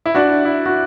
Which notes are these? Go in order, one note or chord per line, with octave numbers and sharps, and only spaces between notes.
E4
D4 F#4
E4
F#4